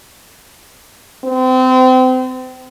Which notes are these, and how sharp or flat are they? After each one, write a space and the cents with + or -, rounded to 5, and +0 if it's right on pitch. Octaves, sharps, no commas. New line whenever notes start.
C4 -30